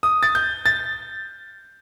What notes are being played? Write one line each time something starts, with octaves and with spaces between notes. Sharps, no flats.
D#6
A6
G6
A6